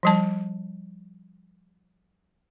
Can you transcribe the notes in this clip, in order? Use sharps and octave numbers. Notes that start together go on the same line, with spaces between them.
F3 G3 A5